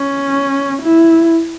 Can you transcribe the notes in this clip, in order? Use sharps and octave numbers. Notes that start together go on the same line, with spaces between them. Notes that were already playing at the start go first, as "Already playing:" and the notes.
Already playing: C#4
E4